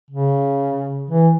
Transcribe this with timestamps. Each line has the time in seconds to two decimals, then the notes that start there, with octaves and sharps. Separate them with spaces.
0.10 C#3
1.10 E3